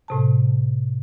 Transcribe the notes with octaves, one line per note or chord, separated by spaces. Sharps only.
A2 C3 A5